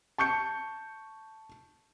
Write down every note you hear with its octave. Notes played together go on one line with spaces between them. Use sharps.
A5 C#6 G6 C#7